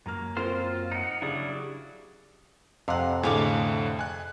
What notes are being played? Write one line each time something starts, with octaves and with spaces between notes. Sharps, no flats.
F#2 F#3 A#3 A#5 F6
C4 F4 A#4 C5
F4
D#4 F#5
C#3 F#3 D4 E4 G4 D#6
F2 C3 F5 F#5
A2 D3 G#4 F5 D6
G#5 F#6